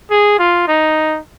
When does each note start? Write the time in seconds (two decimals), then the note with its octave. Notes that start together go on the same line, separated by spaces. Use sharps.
0.11 G#4
0.39 F4
0.68 D#4